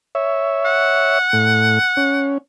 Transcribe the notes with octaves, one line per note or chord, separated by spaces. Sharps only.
C#5 E5
F#5
A2
C#4